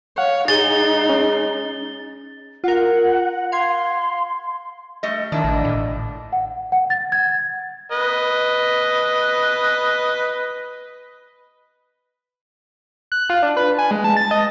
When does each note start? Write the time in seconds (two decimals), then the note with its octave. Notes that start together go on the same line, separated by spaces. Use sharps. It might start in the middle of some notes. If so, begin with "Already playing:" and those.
0.18 C#5 F5 F#5
0.48 G#3 D#4 G#4 A6 G7
1.09 C#4
2.64 F4 A#4 F#5
3.52 F5 C6 G#6 C7
5.03 G3 A3 D#5
5.32 D#3 D4 E4 D5 D#5
5.44 A1
5.65 A2
6.33 F#5
6.72 F#5
6.90 A6
7.12 G#6
7.92 B4 D#5
13.12 F#6
13.30 F4
13.43 D4
13.57 B4
13.78 G#5
13.91 G#3
14.04 A5
14.17 A6
14.31 D#5